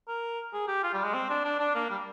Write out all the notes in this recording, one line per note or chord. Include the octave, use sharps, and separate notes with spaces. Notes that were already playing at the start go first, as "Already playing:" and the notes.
A#4
G#4
G4
F4
G3
G#3
C4
D4
D4
D4
A#3
G3